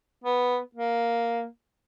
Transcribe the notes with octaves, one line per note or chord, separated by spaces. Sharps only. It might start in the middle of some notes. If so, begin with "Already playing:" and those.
B3
A#3